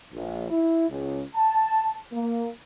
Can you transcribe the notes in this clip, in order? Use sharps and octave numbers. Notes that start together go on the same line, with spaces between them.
A#1
E4
C#2
A5
A#3